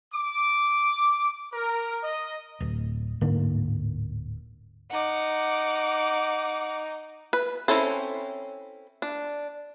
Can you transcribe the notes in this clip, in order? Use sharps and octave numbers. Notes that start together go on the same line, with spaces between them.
D6
A#4
D#5
D1
D1 G#2 D3 A#3
D#4 F#5 D6
B4
C4 C#4 E4 A4 C5
D4